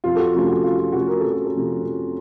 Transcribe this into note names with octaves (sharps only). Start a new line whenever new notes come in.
F2 F4
A4
F#4
C3 F3 A3 C#4 F4
F#4
F2 F4
F4
C3 F3 A3 C#4 F#4
A#4
F2 A4
F#4
A4
C3 F3 A3 C#4
F2